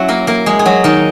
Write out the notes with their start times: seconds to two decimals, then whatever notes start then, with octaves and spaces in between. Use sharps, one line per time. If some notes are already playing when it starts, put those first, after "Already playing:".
Already playing: F#3 C#4 E4 F#4
0.08 A#3 A#4
0.27 A#3 A#4
0.46 G#3 G#4
0.59 G#4
0.66 F#3 F#4
0.84 D#3 D#4